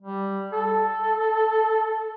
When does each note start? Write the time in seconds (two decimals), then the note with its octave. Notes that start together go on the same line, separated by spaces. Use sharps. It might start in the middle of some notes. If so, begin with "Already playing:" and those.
0.02 G3
0.53 A4